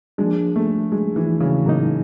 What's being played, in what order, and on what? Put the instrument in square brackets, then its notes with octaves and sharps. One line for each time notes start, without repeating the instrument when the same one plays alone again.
[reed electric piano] F3 A#3 D4 [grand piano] G#3
[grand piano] A3
G#3
E3
C#3
[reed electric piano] A2 F#3 A#3 D#4